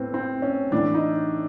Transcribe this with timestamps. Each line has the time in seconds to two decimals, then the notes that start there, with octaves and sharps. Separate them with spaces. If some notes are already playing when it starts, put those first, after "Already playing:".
Already playing: A2 B3 C4
0.14 C4
0.42 C#4
0.72 A2 E3 D4
0.94 D#4